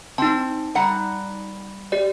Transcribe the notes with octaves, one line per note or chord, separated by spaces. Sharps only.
C4 D#4 A5
G3 F#5 A#5
G4 D5